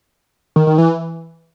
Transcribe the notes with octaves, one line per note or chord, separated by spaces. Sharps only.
D#3
D#3
E3